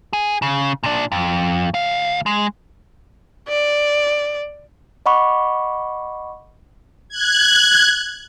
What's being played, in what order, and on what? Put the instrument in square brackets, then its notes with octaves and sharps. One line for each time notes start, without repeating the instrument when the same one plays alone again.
[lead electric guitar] G#4
C#3
A#2 D4
F2
D2 F5
G#3
[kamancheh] D5
[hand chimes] D#5 F#5 B5 C#6 D6
[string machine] F#6 G#6